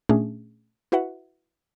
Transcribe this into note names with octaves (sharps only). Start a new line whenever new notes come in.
A#2 A3 C#4 D4 G#4
E4 F#4 B4 E5 F#5